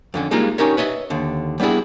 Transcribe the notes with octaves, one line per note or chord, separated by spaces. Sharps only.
F2 D3 C#4
G3 G#3 A#3 D#4 F4
C#4 D#4 G4 A#4 C#5
B4 C#5 D#5 E5
D#2 D3
G3 B3 D4 E4 G#4